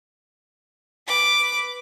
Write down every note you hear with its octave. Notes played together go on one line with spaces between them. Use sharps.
B4 D6